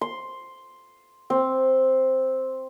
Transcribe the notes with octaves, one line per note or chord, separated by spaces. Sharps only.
C6
C4